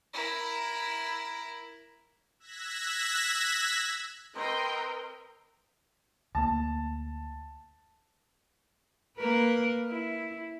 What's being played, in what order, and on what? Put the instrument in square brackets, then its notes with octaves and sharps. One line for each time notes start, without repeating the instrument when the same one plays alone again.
[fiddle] E4 A#4
[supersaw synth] E6 F#6 G#6 A#6 B6
[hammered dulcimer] C4 B4 [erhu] A#4 [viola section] D#5 G5 C6
[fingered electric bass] D2 A3 A#3 [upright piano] A5
[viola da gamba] A#3 A#4 B4
E4